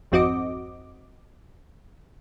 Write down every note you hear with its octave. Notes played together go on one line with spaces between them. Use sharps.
G#1 F2 C4 F#4 D#5 D6